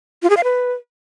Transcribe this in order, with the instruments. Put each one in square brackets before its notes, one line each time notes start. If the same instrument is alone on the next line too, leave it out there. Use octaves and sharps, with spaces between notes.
[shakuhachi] F4
G#4
F5
B4